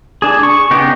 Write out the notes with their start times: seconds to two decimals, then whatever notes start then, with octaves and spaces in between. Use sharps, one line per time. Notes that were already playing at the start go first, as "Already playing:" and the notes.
0.22 D4 G#4
0.43 C#6
0.71 C#3 B3 D#4 G4